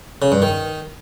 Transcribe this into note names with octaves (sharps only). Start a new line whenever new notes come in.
C#3
G2
D#3